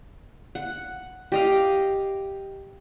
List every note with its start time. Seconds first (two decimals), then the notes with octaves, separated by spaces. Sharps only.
0.55 F#5
1.32 G4 D#5 F5